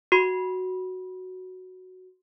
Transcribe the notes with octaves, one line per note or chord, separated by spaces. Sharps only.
F#4 C6